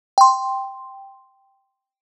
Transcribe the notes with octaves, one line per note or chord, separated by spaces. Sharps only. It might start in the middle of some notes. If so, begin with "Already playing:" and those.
G5 C6